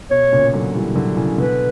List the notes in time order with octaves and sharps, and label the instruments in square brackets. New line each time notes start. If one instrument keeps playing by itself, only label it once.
[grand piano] B2 [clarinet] C#5
[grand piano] A#2 C#3
D3 F#3
E3 G3
D3 F#3
C#3 E3
[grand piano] B2 D3 [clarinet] B4